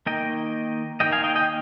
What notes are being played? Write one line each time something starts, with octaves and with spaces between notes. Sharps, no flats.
D#3 A#3 D#5 G5
D#3 G3 A#3 D#5 G5
F5 G#5
D#5 G5
D#5 G5